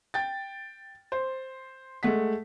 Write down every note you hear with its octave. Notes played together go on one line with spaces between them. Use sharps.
G5 A6
C5
G#3 A3 F#5 B6